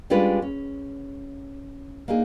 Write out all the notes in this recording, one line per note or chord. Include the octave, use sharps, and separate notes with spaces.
G3 G#3 C#4 D4 F4 B4
C#4
A#3 D4 D#4 G#4